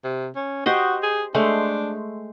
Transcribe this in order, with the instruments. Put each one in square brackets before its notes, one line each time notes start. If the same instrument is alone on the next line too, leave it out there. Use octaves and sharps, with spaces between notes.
[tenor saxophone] C3
C#4
[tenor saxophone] F#4 [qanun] G4 C5 D#5
[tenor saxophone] G#4
[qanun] G#3 A3 C5 [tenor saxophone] D4